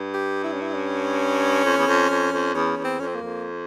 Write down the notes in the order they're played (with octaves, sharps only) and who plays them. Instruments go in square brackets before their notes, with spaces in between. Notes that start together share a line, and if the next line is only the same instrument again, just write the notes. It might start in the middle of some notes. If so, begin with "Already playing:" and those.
Already playing: [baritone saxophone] G2
[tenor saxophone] G4
E4
C#4
E4
C#4
[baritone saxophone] F2
E2
F2
F2
F2
[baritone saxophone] E2 [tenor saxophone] C#4
[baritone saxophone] E2
[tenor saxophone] C4
[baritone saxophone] F2 [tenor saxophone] C#4
[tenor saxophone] C4
A#3
[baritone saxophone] F2